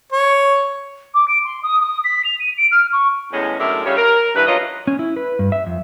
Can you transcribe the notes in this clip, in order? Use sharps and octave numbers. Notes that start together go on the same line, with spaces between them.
C#5
D6
D7
C6
D#6
D#6
B6
F7
D#7
D7
F6
C#6
E2 A2 G#3 C#4
F#2 A2 G#3 D4 A#4 E5
C#3 G3 F4 C#5
A#4
G2 E3 B4
F3 F#3 A#3 C#4 F4 D#5
C#4
E4
B4
G2
E5
F2